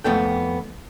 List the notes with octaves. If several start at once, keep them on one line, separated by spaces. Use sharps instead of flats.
F2 A3 B3 A4 G5